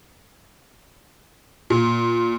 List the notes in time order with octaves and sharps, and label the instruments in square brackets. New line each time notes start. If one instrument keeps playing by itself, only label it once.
[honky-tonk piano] A#2